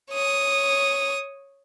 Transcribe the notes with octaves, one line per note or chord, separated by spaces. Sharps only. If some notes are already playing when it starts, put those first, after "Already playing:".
C#5 D#6